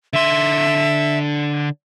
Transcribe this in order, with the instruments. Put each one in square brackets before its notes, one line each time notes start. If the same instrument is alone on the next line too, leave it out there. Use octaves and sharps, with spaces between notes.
[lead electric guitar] D3 C6 [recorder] E5